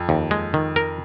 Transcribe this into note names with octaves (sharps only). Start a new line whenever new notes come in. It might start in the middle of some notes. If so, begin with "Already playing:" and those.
Already playing: F2
D#2
G#3
D#3
A#4